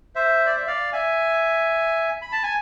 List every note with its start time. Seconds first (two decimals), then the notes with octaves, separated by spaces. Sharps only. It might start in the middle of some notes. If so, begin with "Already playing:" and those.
0.15 C5 E5
0.46 D5
0.57 E5
0.67 D5 F5
0.93 E5 G#5
2.22 B5
2.32 A5
2.43 G#5